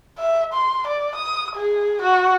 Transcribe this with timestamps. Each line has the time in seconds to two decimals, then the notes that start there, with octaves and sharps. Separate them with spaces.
0.18 E5
0.53 C6
0.87 D5
1.15 D#6
1.55 G#4
2.01 F#4